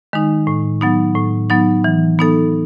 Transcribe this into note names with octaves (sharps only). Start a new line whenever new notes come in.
D#3 G#3 D#4
A2
F#3 B3 D#4
A2
F#3 B3 D#4
E3
B3 D#4 A4